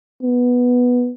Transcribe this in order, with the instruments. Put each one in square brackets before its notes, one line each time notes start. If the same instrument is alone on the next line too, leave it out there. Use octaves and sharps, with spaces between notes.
[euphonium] B3